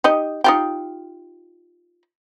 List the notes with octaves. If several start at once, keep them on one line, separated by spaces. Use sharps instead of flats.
D#4 G4 D#5
D#4 F4 G4